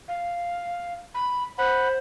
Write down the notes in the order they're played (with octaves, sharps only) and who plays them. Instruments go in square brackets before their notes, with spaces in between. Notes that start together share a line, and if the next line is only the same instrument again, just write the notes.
[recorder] F5
B5
[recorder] C5 [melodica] F#5 B5